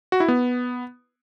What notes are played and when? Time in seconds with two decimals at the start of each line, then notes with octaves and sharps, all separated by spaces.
0.12 F#4
0.20 E4
0.28 B3